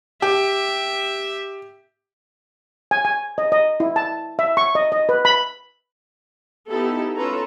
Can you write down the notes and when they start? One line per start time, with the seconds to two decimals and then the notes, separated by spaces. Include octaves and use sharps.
0.22 G4 E5
2.91 G#5
3.05 G#5
3.38 D#5
3.52 D#5
3.80 E4
3.96 A5
4.39 E5
4.57 C#6
4.75 D#5
4.92 D#5
5.09 B4
5.25 B5
6.70 B3 D#4 E4 G4 A4
7.15 C#4 F4 A4 B4 C#5 A#5